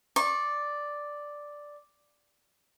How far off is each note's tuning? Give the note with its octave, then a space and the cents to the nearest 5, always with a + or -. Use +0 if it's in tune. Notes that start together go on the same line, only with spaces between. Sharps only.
D5 +0 C#6 -35